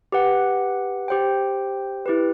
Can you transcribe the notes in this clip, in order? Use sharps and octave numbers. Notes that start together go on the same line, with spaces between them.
G4 B4 F#5
G4 C5 G5
E4 G4 B4